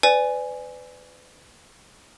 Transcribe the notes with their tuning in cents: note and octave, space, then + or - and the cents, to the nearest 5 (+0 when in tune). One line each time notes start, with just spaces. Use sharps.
B4 +30 D5 +0 G#5 +0